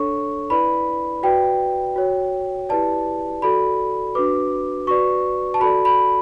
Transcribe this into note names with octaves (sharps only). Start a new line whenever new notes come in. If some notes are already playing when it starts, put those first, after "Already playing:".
Already playing: D4 A4 C#5 C#6
E4 B4 D5 B5
F#4 B4 D5 G5
F#4 C#5
E4 G4 B4 D5 A5
F#4 A4 D5 B5
D4 F#4 B4 D6
F#4 B4 D5 C#6
A5
F#4 A4 D5 B5
B5